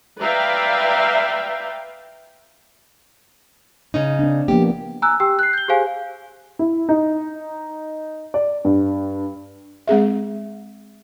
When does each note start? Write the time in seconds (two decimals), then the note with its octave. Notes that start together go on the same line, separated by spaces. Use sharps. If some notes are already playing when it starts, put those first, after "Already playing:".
0.20 B4 D5 E5 F5 G5 A#5
3.94 C#3 C#4 D#4
4.19 C4 D4
4.48 F3 A#3 B3 G4
5.02 G#5 A#5 E6 F#6
5.20 G4 G5 E6
5.39 F#6 C7
5.53 G6 G7
5.68 G4 G#4 C5 F5 G#5
6.59 E4
6.89 D#4
8.34 D5
8.65 G2
9.88 G#3 C4 G#4 E5